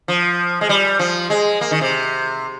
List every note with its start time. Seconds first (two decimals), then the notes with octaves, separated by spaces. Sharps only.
0.08 F3
0.61 G#3
0.69 G3
0.99 F3
1.30 G#3
1.61 A#3
1.71 D#3
1.81 C3